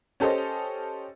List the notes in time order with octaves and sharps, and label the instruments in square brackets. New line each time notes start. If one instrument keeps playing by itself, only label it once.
[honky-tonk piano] C#4 G4 A4 C5 D#5